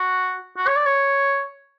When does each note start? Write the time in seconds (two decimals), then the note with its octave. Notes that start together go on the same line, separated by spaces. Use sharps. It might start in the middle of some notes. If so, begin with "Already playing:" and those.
Already playing: F#4
0.57 F#4
0.67 C#5
0.76 D5
0.86 C#5